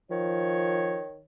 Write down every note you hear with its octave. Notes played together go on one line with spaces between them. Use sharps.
D#3 F3 C#5